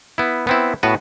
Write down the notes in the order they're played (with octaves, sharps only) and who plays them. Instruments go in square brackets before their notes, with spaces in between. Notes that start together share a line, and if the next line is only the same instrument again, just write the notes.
[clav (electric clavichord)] B3 E4
B3 C4 E4
A2 B3 F#4 B4